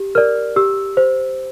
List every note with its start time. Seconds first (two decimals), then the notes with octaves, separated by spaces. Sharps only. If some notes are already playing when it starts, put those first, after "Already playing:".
Already playing: G4
0.15 A#4 D5 F6
0.56 G4 E6
0.97 C5